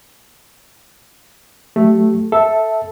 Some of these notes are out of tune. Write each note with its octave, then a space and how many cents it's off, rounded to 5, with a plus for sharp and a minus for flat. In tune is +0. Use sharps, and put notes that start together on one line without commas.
F#3 -10 A3 +0 G4 -30
A4 +0 E5 -10 A5 +0